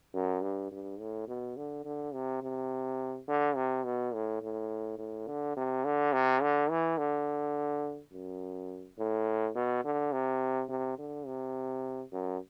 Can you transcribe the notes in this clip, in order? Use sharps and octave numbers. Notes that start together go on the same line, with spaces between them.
F#2
G2
G2
A2
B2
D3
D3
C3
C3
D3
C3
B2
A2
A2
A2
D3
C3
D3
C3
D3
E3
D3
F#2
A2
B2
D3
C3
C3
D3
C3
F#2